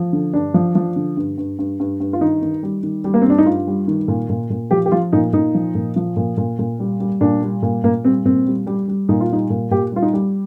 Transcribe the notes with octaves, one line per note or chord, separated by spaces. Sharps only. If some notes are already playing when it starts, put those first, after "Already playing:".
Already playing: F3
D3
G2 D4
F3
F3
D3
G2
G2
G2
G2
G2
F4
D#3 D#4
D#3
G3
D#3
G3
A#3
C4
G2 D4
D#4
G2 F4
G3
D#3
A#2
A#2
A#2
F3 G4
G4
F3 F4
A#2 D#4
A#2 D#4
F3
A#2
F3
A#2
A#2
A#2
G3
G3
A#2 D4
G3
A#2
A#2 A#3
G3 C4
A#2 C4
G3
G3
G3
A#2 D#4
F4
G3 D#4
A#2
A#2 G4
G3 F4
D#4
G3